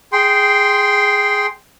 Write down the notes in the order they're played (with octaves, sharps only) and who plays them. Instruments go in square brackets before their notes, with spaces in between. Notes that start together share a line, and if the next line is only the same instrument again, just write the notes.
[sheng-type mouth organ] G#4 G5 C6